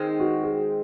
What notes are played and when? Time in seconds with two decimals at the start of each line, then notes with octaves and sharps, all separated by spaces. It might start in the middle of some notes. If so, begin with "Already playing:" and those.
Already playing: D#3 G#3 C4
0.20 F#4
0.44 G#4